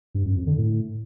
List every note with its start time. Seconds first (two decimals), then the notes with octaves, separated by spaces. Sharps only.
0.15 G2
0.25 F#2
0.36 F2
0.47 D3
0.58 A2